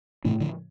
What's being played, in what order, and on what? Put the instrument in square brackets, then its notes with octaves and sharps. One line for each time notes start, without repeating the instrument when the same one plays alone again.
[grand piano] A2 [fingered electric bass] C3 E3
[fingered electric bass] D3 F3